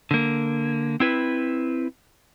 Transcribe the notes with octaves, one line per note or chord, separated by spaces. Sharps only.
D3 A#3
C4 E4 B4